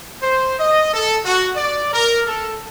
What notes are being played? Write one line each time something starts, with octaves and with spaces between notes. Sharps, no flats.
C5
D#5
A4
F#4
D5
A#4
A4